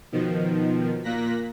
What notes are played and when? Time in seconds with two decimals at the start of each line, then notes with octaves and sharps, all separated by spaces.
0.12 B2 D#3 F3
1.03 A#2 A#3 F#6 A#6 B6